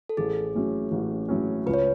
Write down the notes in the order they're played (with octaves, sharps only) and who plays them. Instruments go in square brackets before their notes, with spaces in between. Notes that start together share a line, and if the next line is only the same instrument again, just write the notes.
[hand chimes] A4
[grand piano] A1 [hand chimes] G#4
[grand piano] A2 F#3 C#4
A1
A2 F#3 C#4
[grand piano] C#2 [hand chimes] B4
[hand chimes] C#5